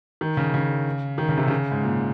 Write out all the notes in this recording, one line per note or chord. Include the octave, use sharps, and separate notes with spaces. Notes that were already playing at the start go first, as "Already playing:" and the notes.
D#3
C#3
C#3
D#3
C#3
C3
C#3
G#2
A#2